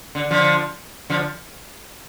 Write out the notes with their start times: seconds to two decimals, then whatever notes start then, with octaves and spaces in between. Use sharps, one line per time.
0.15 D3
0.30 D3 F3
1.10 D3 F3